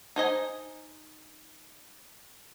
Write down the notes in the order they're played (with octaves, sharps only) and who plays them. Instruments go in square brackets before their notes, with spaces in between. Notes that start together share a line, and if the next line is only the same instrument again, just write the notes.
[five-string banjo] D#4 C5 D#5 G#5